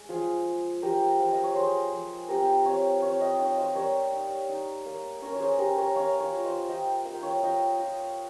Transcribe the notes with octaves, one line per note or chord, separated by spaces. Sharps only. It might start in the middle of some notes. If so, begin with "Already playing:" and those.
Already playing: G#3
F3 F4 G#4
G#3
F3 G4 A#4
F3 F5
D#5
C#5
F3 G#4 C5
F3
C4 G4 A#4
C4 C#5 F5
C4 C#5 F5
D#5 G5
D#4 C#5 F5
C5 D#5
G3 A#4 C#5
D#4
D#4
A#3
C#4 A#4 C#5
C#5
G#4 C5
C#4 G4 A#4
A#4 C#5
A#3 C#5 F5
C#5 F5
F4
C5 D#5
F4 D#5 G5
A#3 F5
G5
C#5 F5
F4 D#5 G5
F4